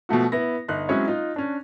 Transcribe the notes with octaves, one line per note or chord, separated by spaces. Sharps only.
B2 F3 A3 F#4
B3 E4 A#6
G1 D#4 F#6
F#3 G#3 C4 C#4 E4 C#5
D#4 F4
C#4 D4